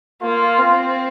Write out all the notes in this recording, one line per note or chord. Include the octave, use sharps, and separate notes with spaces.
A#3 F4
C4